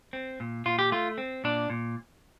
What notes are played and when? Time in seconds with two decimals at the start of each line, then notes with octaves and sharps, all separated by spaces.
0.13 C4
0.40 A#2
0.66 A#2 F4
0.79 G4
0.92 A3 F4
1.18 C4
1.44 A#2 D4
1.70 A#2